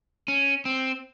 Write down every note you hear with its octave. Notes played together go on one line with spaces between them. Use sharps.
C#4
C4